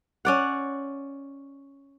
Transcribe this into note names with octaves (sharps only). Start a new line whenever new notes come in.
C#4 D5 F#5